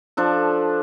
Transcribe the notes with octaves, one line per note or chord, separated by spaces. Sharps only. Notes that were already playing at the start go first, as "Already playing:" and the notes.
F3 D4 A4